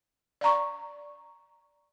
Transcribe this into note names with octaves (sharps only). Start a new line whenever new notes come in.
D5 F5 A#5 C#6